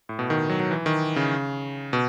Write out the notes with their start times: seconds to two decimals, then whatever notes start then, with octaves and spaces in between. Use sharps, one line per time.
0.09 A2
0.19 B2
0.30 D#3
0.49 F#3
0.60 F#3
0.71 E3
0.86 D#3
1.16 C#3
1.93 B2